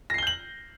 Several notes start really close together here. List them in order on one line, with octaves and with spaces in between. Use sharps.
A#6 C7 G7 G6 F#7